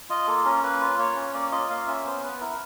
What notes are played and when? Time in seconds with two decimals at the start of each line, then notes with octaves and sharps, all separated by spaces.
0.09 F4 D#5
0.27 A#3 A4
0.45 C#4 A#4
0.63 A#3 B4
0.81 F4
0.98 A#3 C#5
1.16 C#4
1.34 A#3 D5
1.52 F4 D#5
1.70 A#3 F5
1.87 C#4 E5
2.05 B3 C5
2.23 B3 B4
2.41 E4 A#4